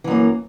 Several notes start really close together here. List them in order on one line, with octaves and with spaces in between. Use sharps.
E3 F#2 A#3